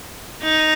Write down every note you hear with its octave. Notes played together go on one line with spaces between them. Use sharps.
D#4